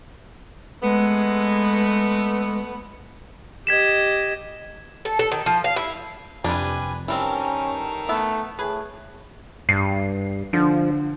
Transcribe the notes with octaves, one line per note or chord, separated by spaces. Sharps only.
G#3 A3 B3
G4 D#5 G#6 B6 E7
A4
A4
D#3
F3
F5
E4
F2 C3 G3 D4 B4 G#5
D#3 E3 G3 C4 C#4 A4 A#4
A3 B3 E5
A2 G#4 B4
G2 C7
D3 F3